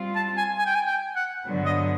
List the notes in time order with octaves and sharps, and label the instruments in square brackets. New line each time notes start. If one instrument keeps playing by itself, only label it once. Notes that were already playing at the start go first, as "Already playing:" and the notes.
Already playing: [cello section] G3 C4 F4
[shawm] A5
G#5
G#5
G5
G#5
G5
F#5
[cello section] G2 D3 F#3 B3
[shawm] D#5